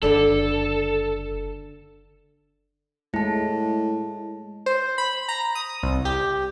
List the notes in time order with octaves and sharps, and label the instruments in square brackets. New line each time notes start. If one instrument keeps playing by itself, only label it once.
[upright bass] F#1 [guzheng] D3 B4 D5 [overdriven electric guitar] A4
[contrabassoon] A2 [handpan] G#3 [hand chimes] E4 A5
[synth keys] C5
B5
A#5
D#6
C2
G4